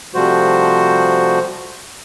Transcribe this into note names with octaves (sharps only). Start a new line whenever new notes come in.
C3 F3 G3 A3 F#4 C5